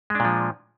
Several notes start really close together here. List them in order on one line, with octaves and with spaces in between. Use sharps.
G#3 D4 A#2 F3